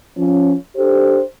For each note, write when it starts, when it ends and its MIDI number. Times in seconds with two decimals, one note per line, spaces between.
0.17 0.54 53
0.17 0.54 61
0.76 1.20 62
0.76 1.20 67
0.76 1.20 69
0.76 1.20 72